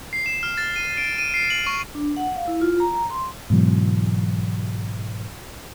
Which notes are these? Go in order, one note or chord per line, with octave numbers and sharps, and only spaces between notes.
C7
E7
F6
A6
D#7
D7
D#7
C7
F#7
C#6
D4
F#5
F5
E4
F4
A#5
C6
G#2 B2 E3 F#3